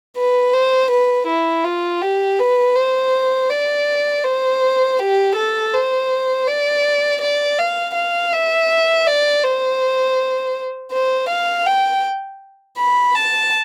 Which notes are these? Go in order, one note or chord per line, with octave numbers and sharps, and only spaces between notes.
B4
C5
B4
E4
F4
G4
B4
C5
D5
C5
G4
A4
C5
D5
D5
F5
F5
E5
D5
C5
C5
F5
G5
B5
A5